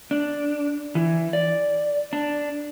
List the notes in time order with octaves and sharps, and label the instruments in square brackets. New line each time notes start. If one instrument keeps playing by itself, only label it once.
[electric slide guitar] D4
E3
D5
D4